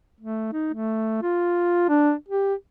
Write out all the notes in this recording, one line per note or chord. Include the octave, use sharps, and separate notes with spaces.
A3
D#4
A3
F4
D4
G4